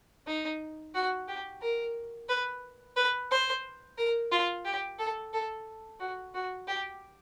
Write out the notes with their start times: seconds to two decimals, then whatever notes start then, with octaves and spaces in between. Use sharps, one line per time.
0.27 D#4
0.95 F#4
1.28 G4
1.62 A#4
2.29 B4
2.96 B4
3.31 C5
3.98 A#4
4.32 F4
4.65 G4
4.99 A4
5.33 A4
5.99 F#4
6.34 F#4
6.68 G4